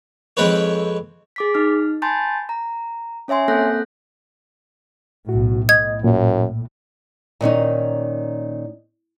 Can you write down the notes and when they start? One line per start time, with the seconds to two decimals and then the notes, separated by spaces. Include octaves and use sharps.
0.37 F2 G#3 C4 B4 C#5
1.36 G#4 D6 B6
1.54 D#4 F6
2.02 G#5 A5 B5 C6 G6 A6
2.49 A#5
3.28 C#4 C#5 E5 G#5 C6
3.48 A#3 C4 A4 F#6 G6 A#6
5.29 B1 A2 F#4
5.69 A2 D#5 G#6
6.04 F#2 A#2
7.41 A#2 D#3 C#4 D#4